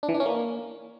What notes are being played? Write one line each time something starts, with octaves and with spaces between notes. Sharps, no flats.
D4
E3
D4
C#4
A#3